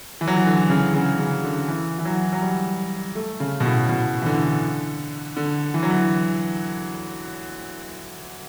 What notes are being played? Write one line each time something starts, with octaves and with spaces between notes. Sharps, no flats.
E3
F#3
E3
D3
C#3
C#3
C#3
D3
E3
E3
F#3
F#3
G3
A3
C#3
B2
A2
B2
E3
D3
D3
E3
F#3
E3